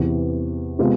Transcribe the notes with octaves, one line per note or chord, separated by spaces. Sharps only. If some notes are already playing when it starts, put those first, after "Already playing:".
Already playing: E2 C3 E3
C3 G#3 B3 F4